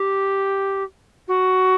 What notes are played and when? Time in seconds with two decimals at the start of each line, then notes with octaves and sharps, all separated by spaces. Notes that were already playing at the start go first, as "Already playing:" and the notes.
Already playing: G4
1.28 F#4